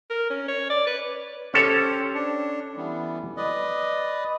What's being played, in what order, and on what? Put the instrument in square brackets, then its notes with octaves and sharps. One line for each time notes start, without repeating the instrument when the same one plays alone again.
[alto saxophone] A#4
C#4
C#5
D5
B4
[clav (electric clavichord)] C#4 A4 C#5 [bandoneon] G4 C5
[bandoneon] D4
E3 G3 B3
B4 D5 D#5